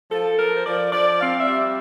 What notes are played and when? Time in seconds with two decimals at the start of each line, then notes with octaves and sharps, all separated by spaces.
0.10 F3 A4
0.38 F3 A#4
0.54 C5
0.65 F3 D5
0.92 F3 D5
1.20 C4 F5
1.38 E5
1.47 G3